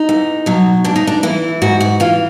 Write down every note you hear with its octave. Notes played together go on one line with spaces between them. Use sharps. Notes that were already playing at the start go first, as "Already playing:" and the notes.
Already playing: D#4
E2
B2 F#3
G#2 D4
D#4
D4
E3 E4
G#2 F#4
F#4
E3 F4